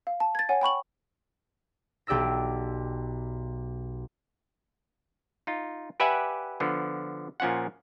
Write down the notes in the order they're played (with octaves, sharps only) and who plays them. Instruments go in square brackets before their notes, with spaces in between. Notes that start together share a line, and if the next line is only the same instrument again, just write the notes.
[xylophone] F5
A5
G#6 A6
C#5 F#5 G#5
G5 B5 C#6 F#7
[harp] B1 G4 D5 E6 A#6
[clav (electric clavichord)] D#4 F4
G4 B4 D5 E5 F#5 G#5
D3 F3 B3
A#2 F3 C#4 F4 F#5